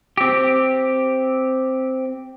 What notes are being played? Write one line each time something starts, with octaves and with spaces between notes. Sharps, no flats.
C4 G4